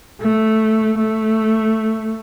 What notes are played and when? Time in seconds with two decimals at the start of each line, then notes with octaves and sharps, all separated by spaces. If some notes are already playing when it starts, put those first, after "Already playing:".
0.21 A3
0.98 A3